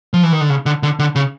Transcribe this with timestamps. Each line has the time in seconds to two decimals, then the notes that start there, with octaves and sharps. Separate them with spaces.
0.14 F3
0.23 E3
0.32 D#3
0.41 D3
0.50 C#3
0.66 D3
0.83 D3
0.99 D3
1.16 C#3